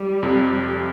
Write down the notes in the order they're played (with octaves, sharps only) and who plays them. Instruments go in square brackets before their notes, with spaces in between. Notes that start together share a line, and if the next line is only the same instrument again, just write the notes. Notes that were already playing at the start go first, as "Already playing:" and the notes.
Already playing: [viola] G3
[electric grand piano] F2 C3 F3